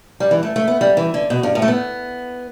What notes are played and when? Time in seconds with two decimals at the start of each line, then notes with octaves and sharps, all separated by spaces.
0.20 G3
0.31 E3
0.43 A3
0.56 A3
0.68 B3
0.81 G3
0.97 E3
1.14 D3
1.30 B2
1.43 G2
1.55 A2
1.62 A3
1.68 B3